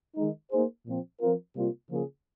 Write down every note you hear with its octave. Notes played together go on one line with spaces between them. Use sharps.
D#3 G#3 D#4
A#3 D#4 G#4 C5
A#2 F3 C4
F3 C4 F4 A#4
C3 G3 A#3 F4
C#3 F3 A#3 F4 G#4